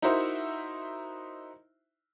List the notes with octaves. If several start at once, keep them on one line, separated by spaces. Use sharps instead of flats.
D#4 E4 F#4 A#4 C5 E5